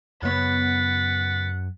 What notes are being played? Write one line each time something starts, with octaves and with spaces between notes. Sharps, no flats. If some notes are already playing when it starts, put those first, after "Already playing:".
F#2 C#3 B3 C#5 F#5 A6 B6